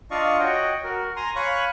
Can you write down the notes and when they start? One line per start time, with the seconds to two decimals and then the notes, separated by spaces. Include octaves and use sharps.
0.11 D4 F4 D5 D#5 F5 C#6
0.39 F#4 C#5 D#5 F#5 G5
0.84 F#4 A#4
1.16 G#5 A#5 C6
1.36 C#5 F5 G#5 B5 C#6 F#6